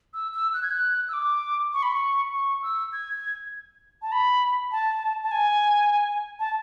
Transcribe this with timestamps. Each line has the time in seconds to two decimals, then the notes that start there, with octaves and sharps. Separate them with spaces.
0.14 E6
0.34 E6
0.54 F#6
0.63 G#6
0.71 F#6
1.09 E6
1.13 D6
1.73 C#6
1.83 B5
1.92 C#6
2.33 C#6
2.62 E6
2.93 G#6
4.02 A5
4.12 B5
4.72 A5
5.22 A5
5.31 G#5
6.39 A5